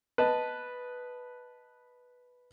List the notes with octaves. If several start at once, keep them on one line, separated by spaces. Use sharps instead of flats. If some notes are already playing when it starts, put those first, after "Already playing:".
B4 D#5 A5